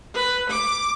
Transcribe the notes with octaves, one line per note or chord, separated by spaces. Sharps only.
B4
D6